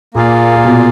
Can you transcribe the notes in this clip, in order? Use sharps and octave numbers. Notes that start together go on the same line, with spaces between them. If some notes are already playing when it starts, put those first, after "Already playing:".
A#2 A#3 F4 G#4 D5 F5
A#2
B2